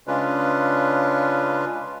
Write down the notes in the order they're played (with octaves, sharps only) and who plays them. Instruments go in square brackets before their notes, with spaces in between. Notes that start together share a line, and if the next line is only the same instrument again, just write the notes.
[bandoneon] C#3 G#3 C#4 D4 F4 B4